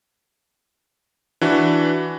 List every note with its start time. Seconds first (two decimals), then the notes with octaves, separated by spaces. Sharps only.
1.41 E3 D4 F#4 B4